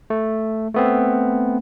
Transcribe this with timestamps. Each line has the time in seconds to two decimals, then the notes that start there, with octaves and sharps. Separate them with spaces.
0.10 A3
0.74 A3 B3 C4